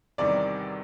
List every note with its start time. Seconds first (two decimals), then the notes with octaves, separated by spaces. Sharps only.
0.18 E2 C3 D#3 G3 D5